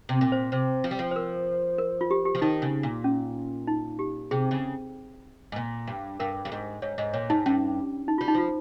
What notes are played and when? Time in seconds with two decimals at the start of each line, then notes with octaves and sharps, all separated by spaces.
0.09 C3
0.21 A#2
0.32 C5
0.52 C3 C5
0.84 F3
0.91 G3
0.99 F3
1.11 C5
1.16 A#4
1.78 A#4
2.01 F4
2.11 G4
2.25 G4
2.35 F3
2.42 D#3 D#4
2.62 C#3
2.83 A#2
3.04 C#4
3.67 D#4
3.99 G4
4.31 C3 G#4
4.51 C#3
5.52 G#2
5.56 A#2
5.87 G2
6.20 G2 A#4
6.45 G2
6.52 G#2
6.82 G#2 C#5
6.98 G#2 D#5
7.13 A#2 C#5
7.30 G#2 D#4
7.46 G2 C#4
8.08 D#4
8.18 G3 F4
8.28 D#4
8.34 F3 F4